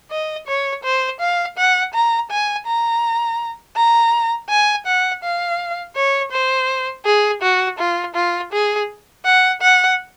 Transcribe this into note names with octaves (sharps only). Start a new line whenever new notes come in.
D#5
C#5
C5
F5
F#5
A#5
G#5
A#5
A#5
G#5
F#5
F5
C#5
C5
G#4
F#4
F4
F4
G#4
F#5
F#5